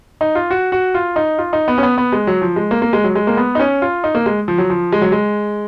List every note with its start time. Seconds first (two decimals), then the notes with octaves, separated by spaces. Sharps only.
0.21 D#4
0.35 F4
0.50 F#4
0.72 F#4
0.94 F4
1.16 D#4
1.38 F4
1.53 D#4
1.68 B3
1.78 C#4
1.83 B3
1.98 B3
2.12 G#3
2.27 F#3
2.42 F3
2.56 G#3
2.71 A#3
2.82 A#3
2.93 G#3
3.04 F#3
3.15 G#3
3.27 A#3
3.37 B3
3.55 D#4
3.60 C#4
3.82 F4
4.04 D#4
4.15 A#3
4.26 G#3
4.48 F3
4.58 F#3
4.70 F3
4.92 G#3
5.02 F#3
5.12 G#3